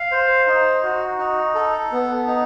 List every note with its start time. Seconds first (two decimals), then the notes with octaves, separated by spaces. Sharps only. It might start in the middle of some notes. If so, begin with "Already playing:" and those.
Already playing: F5
0.12 C5
0.47 D#4
0.83 F#4
1.19 D#4
1.55 A4
1.92 B3
2.27 D#4